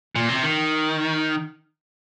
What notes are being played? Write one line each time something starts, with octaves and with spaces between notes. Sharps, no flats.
A#2
C3
D#3